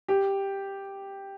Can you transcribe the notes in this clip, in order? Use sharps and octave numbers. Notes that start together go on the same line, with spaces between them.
G4